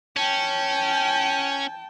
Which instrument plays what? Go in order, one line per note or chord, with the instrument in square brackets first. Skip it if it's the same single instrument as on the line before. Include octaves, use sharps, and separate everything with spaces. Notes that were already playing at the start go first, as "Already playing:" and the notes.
[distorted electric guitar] C#4 [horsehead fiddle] G5 A5